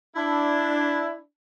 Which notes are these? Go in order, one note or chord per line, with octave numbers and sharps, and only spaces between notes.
D4 E4